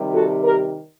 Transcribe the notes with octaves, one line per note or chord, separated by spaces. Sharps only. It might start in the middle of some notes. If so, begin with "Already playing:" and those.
Already playing: C3 D#3 G3
F#4 A4
G4 A#4